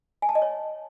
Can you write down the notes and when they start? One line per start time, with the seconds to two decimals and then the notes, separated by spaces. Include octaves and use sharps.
0.22 G#5
0.29 A5
0.35 D#5
0.42 C#5